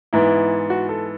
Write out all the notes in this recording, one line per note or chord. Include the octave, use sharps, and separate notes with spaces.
G#2 E3 B3 E4
F#4
A4